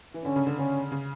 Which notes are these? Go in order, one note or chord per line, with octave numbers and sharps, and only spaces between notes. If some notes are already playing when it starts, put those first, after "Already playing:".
E3
D3 C#4
C#3
D3
D3 C#4
C#3